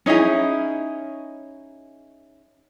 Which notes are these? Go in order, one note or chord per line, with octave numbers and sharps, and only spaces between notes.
C#4 D#4 E4 G#4